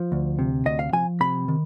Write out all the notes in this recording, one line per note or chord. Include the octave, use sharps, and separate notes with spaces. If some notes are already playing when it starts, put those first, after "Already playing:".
Already playing: F3
D2
C3
D2 D#5
F5
F3 G#5
C3 B5
D#3